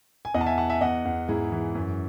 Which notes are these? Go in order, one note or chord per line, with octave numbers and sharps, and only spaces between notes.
G#5
E2 D#5 F#5
A5
E5 G#5
E2 F#5 A5
E5 G#5
E2 D#5 F#5
E2
G#2 E4 G#4
E3
F#2